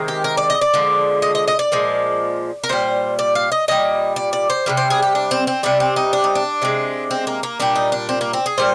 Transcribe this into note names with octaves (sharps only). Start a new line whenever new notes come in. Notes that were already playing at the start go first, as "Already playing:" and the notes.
Already playing: C3 D#3 G#3
G4
A#4
D5
D#5
D5
D3 F3 G#3
D#5
D#5
D#5
D5
A#2 F3 G#3
A#4
A#2 G3 C5
D5
F5
D#5
A#2 G3 D#5
D5
D5
C5
C3 D#3 G3
C5
G#4
G4
D4
C4
C4
C3 G3 D4
C4
D#4
D4
D#4
D4
C3 D#3 G#3
C4
A#3
A#3
A#2 G3 D4
D#4
D4
C4
A#3
C4
G#4
A#2 G3 C5